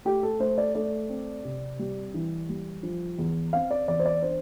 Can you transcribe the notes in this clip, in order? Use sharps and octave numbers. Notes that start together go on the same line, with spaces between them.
A3 G4
A4
A3 C5
D5
A3 D5
C4
C3
G3
E3
G3
F3
E2
C4 F5
D5
E2 D5
C5
D5
D4 C5